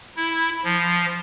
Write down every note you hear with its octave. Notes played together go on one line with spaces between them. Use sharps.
E4
F3